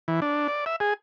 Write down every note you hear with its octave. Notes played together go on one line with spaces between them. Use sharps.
E3
D4
D5
E5
G#4